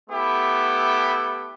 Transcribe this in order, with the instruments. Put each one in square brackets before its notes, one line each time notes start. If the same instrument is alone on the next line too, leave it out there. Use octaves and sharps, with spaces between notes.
[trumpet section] A3 B3 E4 G4